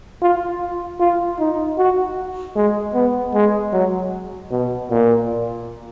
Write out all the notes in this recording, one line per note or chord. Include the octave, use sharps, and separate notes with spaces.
F4
F4
D#4
F#4
G#3
B3
G#3
F#3
B2
A#2